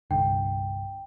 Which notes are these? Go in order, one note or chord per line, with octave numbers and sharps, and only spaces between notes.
C2 G2 D3 G5